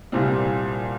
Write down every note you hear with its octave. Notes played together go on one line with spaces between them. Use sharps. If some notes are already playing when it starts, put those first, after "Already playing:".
C2 A#2 G3 C4